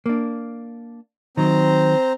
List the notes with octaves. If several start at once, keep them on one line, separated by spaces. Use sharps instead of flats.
A#3 D4
D#3 F#3 C4 C5 A#5